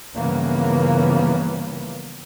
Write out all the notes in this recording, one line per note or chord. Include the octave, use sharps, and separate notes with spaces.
G2 C#3 E3 F3 A#3 B3